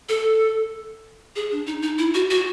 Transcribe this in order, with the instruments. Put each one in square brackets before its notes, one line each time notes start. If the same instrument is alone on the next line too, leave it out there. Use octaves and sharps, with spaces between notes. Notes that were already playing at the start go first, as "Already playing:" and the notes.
[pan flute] A4
G#4
D4
D#4
D#4
E4
F#4
F#4